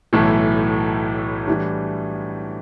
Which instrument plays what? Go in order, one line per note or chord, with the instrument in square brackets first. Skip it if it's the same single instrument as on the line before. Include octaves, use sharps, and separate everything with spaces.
[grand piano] B1 A2 E3 A3 E4
A2 E3 G3 D4